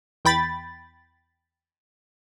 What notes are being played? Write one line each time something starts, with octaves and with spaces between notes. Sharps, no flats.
E2 G5 B5 A6